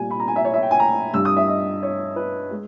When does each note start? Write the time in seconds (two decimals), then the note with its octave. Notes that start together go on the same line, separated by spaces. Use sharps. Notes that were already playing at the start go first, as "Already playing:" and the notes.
Already playing: A#2 G3 G#5
0.10 B5
0.20 A#5
0.28 G#5
0.36 E5
0.45 C#5
0.54 E5
0.63 G5
0.71 G#5
0.80 A#5
1.14 G2 E6
1.17 G3
1.25 D#6
1.37 E5
1.48 D#5
1.83 C#5
2.16 B4
2.51 G#3